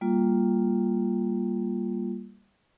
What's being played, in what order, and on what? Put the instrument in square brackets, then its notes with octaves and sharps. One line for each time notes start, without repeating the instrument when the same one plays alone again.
[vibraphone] G3 A#3 F4